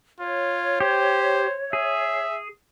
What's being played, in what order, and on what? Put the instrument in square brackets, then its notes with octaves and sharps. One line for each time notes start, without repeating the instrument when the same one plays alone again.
[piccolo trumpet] F4 [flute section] C#5
[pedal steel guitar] G4 [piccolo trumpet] C5
[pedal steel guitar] G#4 [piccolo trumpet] E5